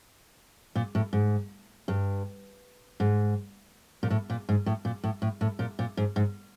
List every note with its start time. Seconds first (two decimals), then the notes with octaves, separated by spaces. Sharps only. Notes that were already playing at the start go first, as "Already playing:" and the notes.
0.75 A#2
0.95 A2
1.13 G#2
1.88 G2
3.00 G#2
4.03 A#2
4.10 A2
4.30 A#2
4.49 G#2
4.66 A2
4.85 A#2
5.04 A2
5.22 A2
5.41 A2
5.59 A#2
5.79 A#2
5.97 G#2
6.16 G#2